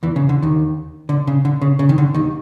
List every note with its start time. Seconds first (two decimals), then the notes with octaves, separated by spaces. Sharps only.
0.03 E2 E3
0.16 C#3
0.29 D3
0.42 D#2 D#3
1.09 D3
1.27 C#3
1.45 D3
1.62 C#3
1.79 C#3
1.89 D#3
1.98 D3
2.14 D#2 D#3